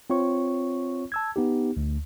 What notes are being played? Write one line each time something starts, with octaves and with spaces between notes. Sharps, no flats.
C4 F4 C#5 C#6
A5 E6 G#6
B3 D#4 G4
D2